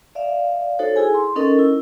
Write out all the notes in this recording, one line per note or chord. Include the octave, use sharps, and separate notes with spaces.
D5 E5 F5
D#4 F#4 A4 C5 C#5
E4 G#4 A4 G#5
C6
C#4 D#4 A4 A#4 D#5
E4